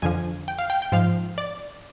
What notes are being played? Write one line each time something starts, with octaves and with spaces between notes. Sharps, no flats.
F2 D3 F3 G#5
G5
F5
G5
G5
G#2 F3 F5
D5